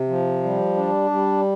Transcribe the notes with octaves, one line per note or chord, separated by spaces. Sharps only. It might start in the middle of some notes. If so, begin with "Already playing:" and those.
Already playing: C3
F3
G3
D4
G3